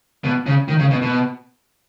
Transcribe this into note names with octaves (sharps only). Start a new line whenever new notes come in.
B2
C#3
D#3
C#3
B2
B2